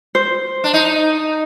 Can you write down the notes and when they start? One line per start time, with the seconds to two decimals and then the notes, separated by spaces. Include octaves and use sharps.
0.15 C5
0.64 D4
0.74 D#4